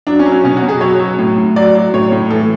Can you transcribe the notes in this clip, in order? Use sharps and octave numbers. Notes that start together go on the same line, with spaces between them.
F#3 D4
C#4
F#3
C#4
B2 C#4
F#4
B2
G#4
F#3 C#5
F#3
A2
A2
F#3 D5
F#3
A2 C#5
A2
E3 A4